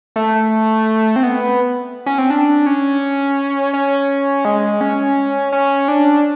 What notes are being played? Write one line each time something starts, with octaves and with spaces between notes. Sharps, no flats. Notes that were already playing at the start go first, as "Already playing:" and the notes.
A3
C4
B3
C#4
C4
D4
C#4
C#4
G#3
C#4
C#4
D4